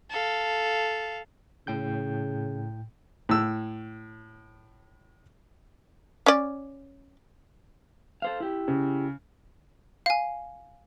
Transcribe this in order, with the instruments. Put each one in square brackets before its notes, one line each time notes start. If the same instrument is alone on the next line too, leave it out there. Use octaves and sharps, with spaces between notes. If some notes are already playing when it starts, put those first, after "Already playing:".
[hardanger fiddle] A4 F5
[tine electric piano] A2 G5 G6 [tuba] C#3
[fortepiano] A2 E6
[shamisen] C#4 D5
[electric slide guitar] A4 C5 F5
E4 G4
[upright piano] C#3
[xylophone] F5 G#5